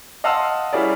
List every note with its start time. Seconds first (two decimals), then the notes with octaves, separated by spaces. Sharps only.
0.24 D#5 F5 F#5 A5 C6 E6
0.73 G3 C#4 E4 G#4 A#4 D5